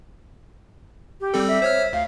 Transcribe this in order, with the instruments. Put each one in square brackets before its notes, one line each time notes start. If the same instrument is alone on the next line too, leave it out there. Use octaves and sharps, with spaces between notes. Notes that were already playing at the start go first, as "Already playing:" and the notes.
[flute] G4
[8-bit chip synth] G3 C4 A4
[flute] E5
[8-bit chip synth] C5 C#5 F6
[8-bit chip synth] D2 [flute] F5